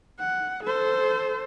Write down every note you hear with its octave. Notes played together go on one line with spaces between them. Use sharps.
F#5
A4 C5